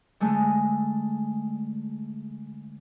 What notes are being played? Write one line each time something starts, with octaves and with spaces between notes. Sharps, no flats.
D3 G#3 A3